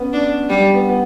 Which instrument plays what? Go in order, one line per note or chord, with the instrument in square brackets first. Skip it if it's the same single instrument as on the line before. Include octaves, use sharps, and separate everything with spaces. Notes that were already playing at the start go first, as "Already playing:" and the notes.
Already playing: [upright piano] B3 C#4
[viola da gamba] D4
G3
[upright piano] B3
B3